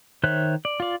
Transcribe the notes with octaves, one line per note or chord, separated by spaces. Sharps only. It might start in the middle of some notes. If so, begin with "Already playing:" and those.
D#3 C5 C#5 E5 F#6
D5
F4 D5